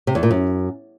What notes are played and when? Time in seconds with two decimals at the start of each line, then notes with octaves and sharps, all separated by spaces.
0.07 C3
0.15 E2
0.23 A#2
0.31 F#2